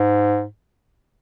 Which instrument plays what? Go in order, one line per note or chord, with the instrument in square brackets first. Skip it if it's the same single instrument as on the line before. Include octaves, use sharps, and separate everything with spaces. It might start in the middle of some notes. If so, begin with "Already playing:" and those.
Already playing: [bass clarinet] G#2